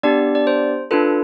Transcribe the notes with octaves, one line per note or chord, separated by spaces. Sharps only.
B3 D4 G4 D5
D5
C5
D4 F4 A4 B4